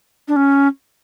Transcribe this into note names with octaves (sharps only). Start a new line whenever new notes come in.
D4
C#4